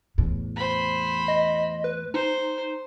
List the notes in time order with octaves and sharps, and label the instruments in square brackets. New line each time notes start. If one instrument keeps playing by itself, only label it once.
[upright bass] E2 A2
[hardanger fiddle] C5 B5
[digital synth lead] D#5
B4
[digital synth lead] D#4 [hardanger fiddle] C5